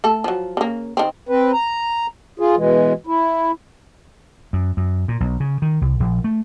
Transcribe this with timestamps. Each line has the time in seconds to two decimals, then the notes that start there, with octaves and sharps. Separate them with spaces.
0.04 A3 A4
0.24 F3 F#3
0.57 C#3 A#3
0.97 D#3 C4
1.29 C4 B4
1.53 A#5
2.39 F4 G#4
2.56 B2 E3 G#3
3.07 E4
4.53 F#2
4.77 F#2
5.08 A#2
5.20 B1
5.40 C#3
5.62 D#3
5.81 C2
6.00 A#1
6.24 A3